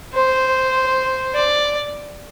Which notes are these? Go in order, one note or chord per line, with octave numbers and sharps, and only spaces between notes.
C5
D5